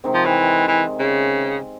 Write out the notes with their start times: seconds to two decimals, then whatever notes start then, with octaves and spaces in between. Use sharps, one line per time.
0.04 C3 D#3 G#3 C4
0.14 F3
0.25 E3
0.67 E3
0.99 C#3